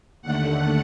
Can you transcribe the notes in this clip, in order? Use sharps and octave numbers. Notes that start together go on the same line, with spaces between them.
D#2 D3 A3 F#5